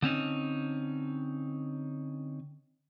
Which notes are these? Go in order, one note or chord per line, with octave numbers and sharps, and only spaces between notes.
D3 C4 C#4 D#4